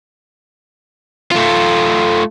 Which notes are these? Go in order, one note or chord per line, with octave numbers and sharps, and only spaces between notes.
A3 F4